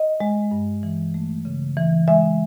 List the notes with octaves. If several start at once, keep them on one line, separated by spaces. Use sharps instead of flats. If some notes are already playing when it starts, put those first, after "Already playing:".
Already playing: D#5
G#3
G2
E3
A3
C#3
E3
G#3 E5